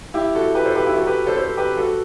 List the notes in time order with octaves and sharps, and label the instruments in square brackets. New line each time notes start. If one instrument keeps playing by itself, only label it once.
[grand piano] E4 G4
F#4 A4
G4 B4
A4 C5
G4 B4
E4 G4
F#4 A4
G4 B4
A4 C5
A4 C5
G4 B4
F#4 A4